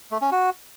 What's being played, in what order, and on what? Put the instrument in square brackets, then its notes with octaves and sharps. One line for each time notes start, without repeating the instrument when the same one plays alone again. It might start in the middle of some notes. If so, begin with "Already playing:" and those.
[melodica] A3
C#4
F#4